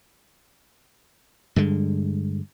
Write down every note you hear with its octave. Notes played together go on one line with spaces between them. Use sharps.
G2 D3 G#3